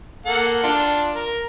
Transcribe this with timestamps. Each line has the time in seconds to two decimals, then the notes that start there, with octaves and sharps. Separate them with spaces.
0.26 A#3 A4 F#5
0.63 D4 F4
1.15 A#4